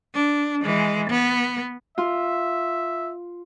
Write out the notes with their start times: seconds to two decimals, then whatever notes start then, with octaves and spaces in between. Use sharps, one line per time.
0.14 D4
0.63 E3 G#3
1.10 B3
1.98 F4 E5